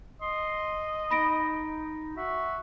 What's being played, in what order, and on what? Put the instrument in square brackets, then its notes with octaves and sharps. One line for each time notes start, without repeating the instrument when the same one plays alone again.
[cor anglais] D#5 [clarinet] C6
[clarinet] D#4 [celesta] B5 A#6 D7
[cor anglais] F#4 [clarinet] E5